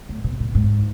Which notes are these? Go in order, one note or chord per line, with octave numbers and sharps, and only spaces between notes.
A2
B2
A#2
G#2